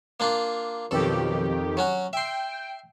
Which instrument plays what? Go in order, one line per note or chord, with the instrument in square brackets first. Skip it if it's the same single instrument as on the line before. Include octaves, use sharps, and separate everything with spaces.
[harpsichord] A#3 D4 F4
[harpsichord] B1 A4 [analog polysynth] F2 D#3 G4
[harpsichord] F#3 C#4 F#4
[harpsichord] E5 C6 [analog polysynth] G5